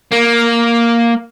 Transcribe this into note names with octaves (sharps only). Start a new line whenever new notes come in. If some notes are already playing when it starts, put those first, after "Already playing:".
A#3